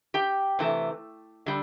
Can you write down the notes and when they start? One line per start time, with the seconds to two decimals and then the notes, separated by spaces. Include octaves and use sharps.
0.14 G4 G5
0.59 C3 E3 A3
1.46 D3 G3